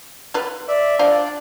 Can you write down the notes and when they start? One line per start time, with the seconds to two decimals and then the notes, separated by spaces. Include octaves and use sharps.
0.34 F4 B4
0.68 D5 E5
0.99 D4 F4 C5 D5 F5